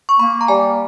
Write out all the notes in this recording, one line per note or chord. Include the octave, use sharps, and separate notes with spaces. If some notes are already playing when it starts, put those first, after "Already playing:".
C#6
A#3 B5
A#5
G3 G#5